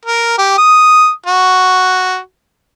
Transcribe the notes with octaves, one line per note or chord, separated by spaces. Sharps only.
A#4
G4
D#6
F#4